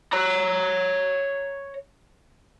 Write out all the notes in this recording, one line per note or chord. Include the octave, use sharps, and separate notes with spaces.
C#5 A#5